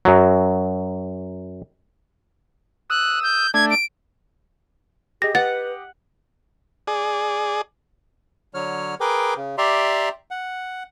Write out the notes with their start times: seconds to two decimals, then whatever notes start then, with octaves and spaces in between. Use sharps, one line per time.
0.05 F#2 F#3
2.90 D#6 E6 F#6
3.23 G6
3.54 A3 D4 G#6
3.71 D7
5.22 G4 G#4 D#5 A#6
5.35 B4 F#5 A6
6.87 G#4 D5
8.54 D3 F#3 C#5 F6
9.00 G#4 A#4 B4 G5 D6
9.37 C#3
9.58 G4 D5 E5 A#5 C6
10.31 F#5